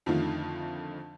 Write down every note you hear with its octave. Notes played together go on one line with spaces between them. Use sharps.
F2 D3 D#3 F3 A3 F4